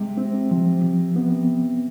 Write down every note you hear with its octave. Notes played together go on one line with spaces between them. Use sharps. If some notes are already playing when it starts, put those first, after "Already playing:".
Already playing: C3 G#3
C4
F3
F3
B3